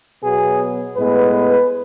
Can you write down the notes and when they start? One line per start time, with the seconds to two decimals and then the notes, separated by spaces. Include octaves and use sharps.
0.22 B2 F#3 B3 G#4
0.96 A2 G#3 B3 B4